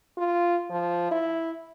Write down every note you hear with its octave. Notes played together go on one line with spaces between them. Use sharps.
F4
F3
E4